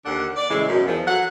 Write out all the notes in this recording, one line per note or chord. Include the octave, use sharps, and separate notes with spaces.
D#2 D3 D4 F#5
D5
A2 C#3 E3 G#3
F#2 B2
E2 F3
F#3 A4 F#5